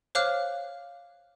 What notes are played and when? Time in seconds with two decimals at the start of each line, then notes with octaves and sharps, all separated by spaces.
0.15 C5 C#5 F5 D6 F6 F#6